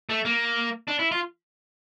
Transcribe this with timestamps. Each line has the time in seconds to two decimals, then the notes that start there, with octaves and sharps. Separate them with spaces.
0.09 A3
0.25 A#3
0.88 D4
0.99 E4
1.12 F4